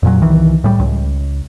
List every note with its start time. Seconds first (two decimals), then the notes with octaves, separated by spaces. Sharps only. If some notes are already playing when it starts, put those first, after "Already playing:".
0.03 F2 A#2 F#3
0.21 C2 D#3 E3
0.64 A2 G3
0.80 C#2